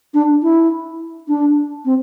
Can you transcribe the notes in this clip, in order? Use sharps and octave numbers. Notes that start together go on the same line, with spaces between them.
D4
E4
D4
C4